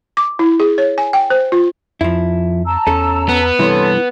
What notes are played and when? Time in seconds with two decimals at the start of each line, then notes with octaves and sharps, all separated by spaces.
0.17 D6
0.39 E4
0.60 G#4
0.78 C#5
0.98 G#5
1.13 G5
1.30 C5
1.52 F4
2.01 F2 F3 E4
2.66 A5 A#5 E6
2.87 E2 C#4 A4
3.29 B3
3.59 G2 C3 E3 E4 A4 C#5 C6